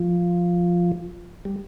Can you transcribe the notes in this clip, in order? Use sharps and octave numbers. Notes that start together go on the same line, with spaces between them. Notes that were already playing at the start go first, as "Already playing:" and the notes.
Already playing: F3
G3